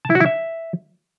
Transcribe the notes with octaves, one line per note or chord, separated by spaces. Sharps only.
A5
E4
F#4
E4
E5